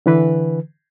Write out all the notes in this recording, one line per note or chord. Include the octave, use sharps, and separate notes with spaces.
D3 E3 B4